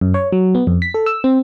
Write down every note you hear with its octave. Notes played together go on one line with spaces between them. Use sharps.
F#2
C#5
F#3
B3
F2
B6
A4
E6
C4